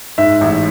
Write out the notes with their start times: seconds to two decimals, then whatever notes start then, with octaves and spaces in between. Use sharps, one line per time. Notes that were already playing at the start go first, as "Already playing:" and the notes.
0.18 G#2 E5
0.41 A1